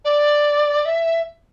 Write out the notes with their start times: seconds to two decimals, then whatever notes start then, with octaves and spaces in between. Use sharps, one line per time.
0.05 D5
0.85 E5